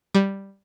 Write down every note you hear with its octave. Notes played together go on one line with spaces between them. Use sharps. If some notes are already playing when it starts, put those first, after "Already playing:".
G3